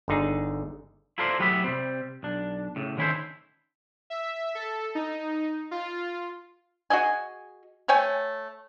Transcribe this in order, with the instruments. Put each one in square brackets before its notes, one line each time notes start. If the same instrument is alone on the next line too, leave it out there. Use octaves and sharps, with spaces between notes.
[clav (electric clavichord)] G1 D3 D#4 G#4
[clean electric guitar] E4 F4 A4 A#4 C5 D5
A2 F#3 B3 G4 B4 E5
C3 G3 C4
B1 D4
A2 C#3
D3 D#3 C#4 E4 A4 C5
[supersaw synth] E5
A4
D#4
F4
[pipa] F#4 G#4 D#5 G#5
A3 C#5 G5 G#5